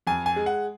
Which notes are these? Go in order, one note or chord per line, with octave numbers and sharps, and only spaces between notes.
F2 G#5
G#5
G#3
F#5